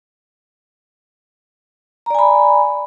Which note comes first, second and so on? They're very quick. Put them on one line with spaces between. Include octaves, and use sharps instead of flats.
A#5 D5 G#5 B5